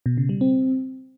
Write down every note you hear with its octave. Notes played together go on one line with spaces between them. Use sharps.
B2
C#3
G3
C4